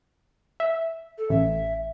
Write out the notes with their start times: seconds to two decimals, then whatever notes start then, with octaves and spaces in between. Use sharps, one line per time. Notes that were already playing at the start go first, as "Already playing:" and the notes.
0.60 E5
1.18 A4
1.30 A1 E5